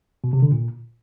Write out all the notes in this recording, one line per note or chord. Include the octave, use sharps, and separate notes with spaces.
B2
C3
D3
A#2